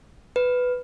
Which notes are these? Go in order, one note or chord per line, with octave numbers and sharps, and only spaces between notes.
B4